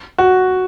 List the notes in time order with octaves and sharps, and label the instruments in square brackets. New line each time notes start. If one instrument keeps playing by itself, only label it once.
[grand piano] F#4